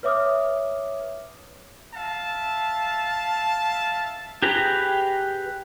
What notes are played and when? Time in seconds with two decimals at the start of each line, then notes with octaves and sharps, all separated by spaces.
0.03 B4 C#5 E5 D6 D#6 F6
1.95 E5 F5 A5
4.42 G4 G#4 B4 A#5